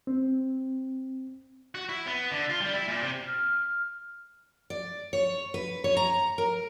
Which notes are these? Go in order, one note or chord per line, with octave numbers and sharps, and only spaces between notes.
C4
F#4
E4
B3
D3
F4
G3
E4
A#2
C3
F6
D5
C#5
B4
C#5
A#5
A#4